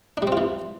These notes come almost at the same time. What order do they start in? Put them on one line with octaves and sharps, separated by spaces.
D4 G3 C4 F4 E3